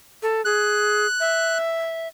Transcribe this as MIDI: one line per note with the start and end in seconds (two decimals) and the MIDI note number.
0.23 0.44 69
0.45 1.06 68
0.45 1.58 90
1.20 2.08 76